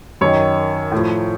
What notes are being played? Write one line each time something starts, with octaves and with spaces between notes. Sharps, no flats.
F#2 D#3 C#5
A2
F3